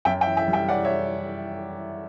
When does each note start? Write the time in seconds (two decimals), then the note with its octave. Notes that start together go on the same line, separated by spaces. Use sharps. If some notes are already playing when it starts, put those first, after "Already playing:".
0.05 F#2 E5 G5
0.21 E5 G5
0.26 E3
0.37 E5 G5
0.48 G3
0.53 E5 G5
0.69 C#4 D5 F#5
0.85 C#5 E5